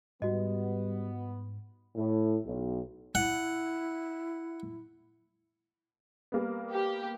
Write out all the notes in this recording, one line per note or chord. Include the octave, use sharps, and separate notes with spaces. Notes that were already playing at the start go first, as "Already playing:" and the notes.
G#2 G3 B3 F#4 D#5
A2
B1
E4 F#5
G3 A#3 B3
G4